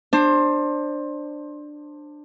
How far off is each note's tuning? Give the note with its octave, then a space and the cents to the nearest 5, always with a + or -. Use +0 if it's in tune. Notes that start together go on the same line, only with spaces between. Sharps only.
D4 +15 C5 +20